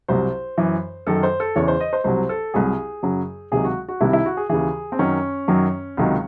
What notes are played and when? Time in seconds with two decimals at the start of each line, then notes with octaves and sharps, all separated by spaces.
0.08 C2 C3 F#3 C5
0.58 F#2 E3
1.07 F#2 D#3 F#3 A4
1.23 C5
1.40 A4
1.56 E2 C#3 E3 C#5
1.68 C5
1.80 D#5
1.93 C5
2.04 C2 C3 F#3 C5
2.29 A4
2.54 C2 C3 F#3 G#4
3.03 F#2 C#3 F#3
3.52 C#2 C3 D#3 F#3 G#4
3.65 F#4
3.89 F#4
4.01 C2 C3 D#3 E4
4.13 E4
4.26 F#4
4.37 G#4
4.49 D#2 C#3 E3 G#4
4.92 C4
4.99 F#2 D#3 F#3 C#4
5.48 F#2 D#3 F#3
5.97 C#2 C3 D#3 F#3